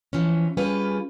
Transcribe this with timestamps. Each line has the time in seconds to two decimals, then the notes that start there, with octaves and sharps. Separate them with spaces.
0.13 E3 F3 C#4
0.57 G3 C#4 F4 G#4 B4